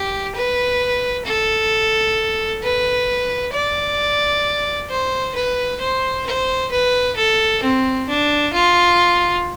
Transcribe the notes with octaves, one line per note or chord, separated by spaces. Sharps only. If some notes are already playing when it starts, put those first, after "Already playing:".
Already playing: G4
B4
A4
B4
D5
C5
B4
C5
C5
B4
A4
C4
D4
F4